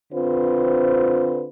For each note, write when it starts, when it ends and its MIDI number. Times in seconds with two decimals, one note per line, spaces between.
0.13 1.47 50
0.13 1.47 60
0.13 1.47 65
0.13 1.47 71
0.13 1.47 72